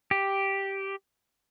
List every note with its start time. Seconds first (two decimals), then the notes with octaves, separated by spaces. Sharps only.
0.11 G4